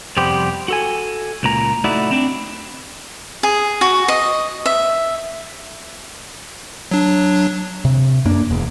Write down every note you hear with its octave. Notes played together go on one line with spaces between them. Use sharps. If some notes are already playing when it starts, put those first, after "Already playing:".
F2 C3 G3 B3 G4 C5
F#4 A4 G#5
C#2 A#2 A#5
A3 D#4 E4 F#4 D5
C4 D4
G#4
F#4
D#5
E5
F#3 D4
C3
F#2 A#3 D4
E1 E2